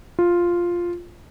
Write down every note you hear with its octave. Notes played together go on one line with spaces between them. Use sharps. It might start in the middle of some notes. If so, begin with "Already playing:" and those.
F4